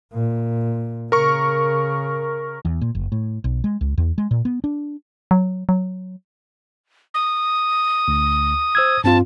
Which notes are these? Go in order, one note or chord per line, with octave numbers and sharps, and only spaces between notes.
A#2
C#3 A#4 C#6
E2
A#2
F#1
A2
B1
G#3
C#2
E2
G#3
A#2
B3
D4
F#3
F#3
D#6
D2
C5 E6 G#6
G2 C4 F4 A5